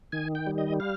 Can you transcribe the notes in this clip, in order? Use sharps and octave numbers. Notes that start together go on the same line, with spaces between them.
D#3 G#5
G5
G3
D#5
F5